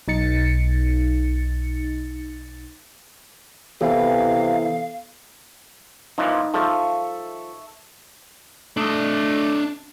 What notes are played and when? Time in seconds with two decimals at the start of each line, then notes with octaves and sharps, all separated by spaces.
0.08 B1 D#4 A6 C#7
3.81 C3 E3 B3 A4 F5
6.18 A#2 E3 F3 D#4
6.54 F3 A4 E5 C#6
8.77 A3 D4 D#5